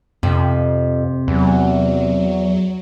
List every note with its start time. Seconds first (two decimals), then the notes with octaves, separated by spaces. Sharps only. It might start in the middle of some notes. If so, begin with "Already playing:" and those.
0.23 F2 C3
1.28 E2 F#3